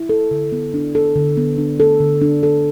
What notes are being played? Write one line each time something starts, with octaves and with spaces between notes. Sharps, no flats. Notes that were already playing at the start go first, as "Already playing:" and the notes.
Already playing: E4
A4
D3
B3
D4
A4
D3
B3
D4
A4
D3
D4
A4